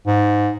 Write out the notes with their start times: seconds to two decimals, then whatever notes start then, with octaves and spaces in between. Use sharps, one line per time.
0.06 G#2